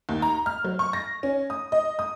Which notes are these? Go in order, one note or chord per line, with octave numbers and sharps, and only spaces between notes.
D#2
A#5
F6
F#3
C#6
A#6
C#4
D#6
D#5
D#6